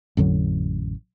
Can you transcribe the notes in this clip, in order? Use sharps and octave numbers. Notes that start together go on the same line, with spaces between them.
A1 F2 D3 F#3